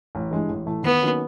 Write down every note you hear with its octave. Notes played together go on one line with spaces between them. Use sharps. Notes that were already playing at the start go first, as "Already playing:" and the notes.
A1
G2 E3 G#3
A1
A2 E3 A3
D#2 B3
D#3 F#3 A#3 C#4